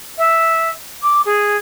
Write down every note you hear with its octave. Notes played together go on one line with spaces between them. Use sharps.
E5
D6
G#4